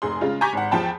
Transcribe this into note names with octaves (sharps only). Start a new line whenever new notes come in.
F1 G#4 C6
C#3 G#3 F4
G#5 A#5 C#6 D6 G6 B6
G#1 F#5
E2 F3 G5 A5 B5